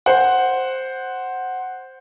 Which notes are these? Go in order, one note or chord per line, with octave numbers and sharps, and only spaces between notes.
C5 F#5